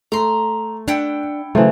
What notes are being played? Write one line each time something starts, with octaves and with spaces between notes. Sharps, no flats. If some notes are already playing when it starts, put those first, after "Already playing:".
A3 A#5 C6
D4 E4 F#5 G5
C#3 E3 F#3 A3 C5